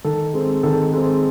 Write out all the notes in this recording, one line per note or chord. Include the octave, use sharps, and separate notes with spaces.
D#3 A4
G#3 C4
D#3 A4
G#3 C4